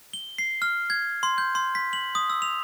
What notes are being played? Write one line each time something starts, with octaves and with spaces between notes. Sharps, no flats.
G7
C7
F6
G#6
C6
G6
C6
B6
F#7
D#6
E6
F7